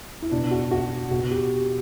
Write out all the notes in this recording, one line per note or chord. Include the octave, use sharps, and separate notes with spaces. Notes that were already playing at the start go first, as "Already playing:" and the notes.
E4
B2 D4
F#4
F#4
B2 F#4
G4